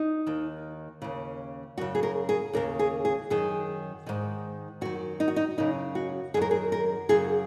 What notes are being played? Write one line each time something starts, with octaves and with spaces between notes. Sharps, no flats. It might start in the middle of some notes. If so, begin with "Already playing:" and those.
Already playing: D#4
D#2 D#3
D#2 C#3
F#2 C#3 F#4
G#4
A#4
G#4
D#2 C#3 A#4
G#4
G#4
F#2 D#3 G#4
G#2 D#3
F#2 D#3 F#4
D#4
F#4
D#4
F#2 C#3 D#4
F#4
F#2 D#3 G#4 A#4
G#4
A#4
F#2 C#3 G#4